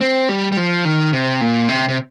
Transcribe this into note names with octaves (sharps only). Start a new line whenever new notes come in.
C4
G3
G3
F3
D#3
C3
A#2
C3
C3